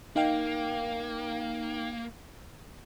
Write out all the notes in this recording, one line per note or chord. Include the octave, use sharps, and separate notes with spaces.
A#3 D#4 F5 G5